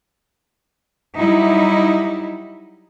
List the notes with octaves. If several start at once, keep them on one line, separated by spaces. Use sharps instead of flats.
F#3 G3 D#4 E4